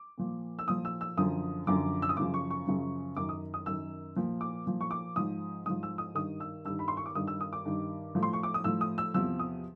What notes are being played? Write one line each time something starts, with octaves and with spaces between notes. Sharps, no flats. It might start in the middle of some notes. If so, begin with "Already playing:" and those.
Already playing: D6
A#2 F3
E6
A#2 F3 D#6
E6
E6
F#2 D3 F3 D#6
F#2 D3 F3 D6
E6
D#6
F#2 C#3 F3 D6
C#6
C#6
F#2 C#3 F3
F#2 D#3 D6
D#6
D#6
F#2 D#3 E6
A#2 F3
D6
A#2 F3
C#6
D6
G#2 F3 D#6
G#2 F3 D#6
E6
D#6
G2 D#3 D#6
E6
G2 D#3 E6
B5
C6
C#6
D6
G2 D#3 D#6
E6
D#6
D6
G2 D#3
A2 F3
C6
C#6
D6
D#6
A2 F3 E6
D#6
E6
E2 C3 F3 E6
D#6